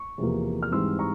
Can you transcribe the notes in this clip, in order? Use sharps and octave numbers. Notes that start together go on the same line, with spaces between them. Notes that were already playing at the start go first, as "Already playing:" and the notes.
Already playing: C#6
E2 C3 F3 A#3
F6
G#2 E3 G3 C4 C6 E6
A#5 C#6